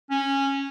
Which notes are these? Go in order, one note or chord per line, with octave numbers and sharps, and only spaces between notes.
C#4